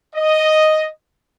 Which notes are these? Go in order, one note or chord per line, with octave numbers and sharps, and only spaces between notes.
D#5